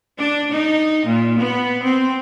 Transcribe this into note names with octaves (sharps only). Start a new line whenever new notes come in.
D4
D#4
A#2
B3
C4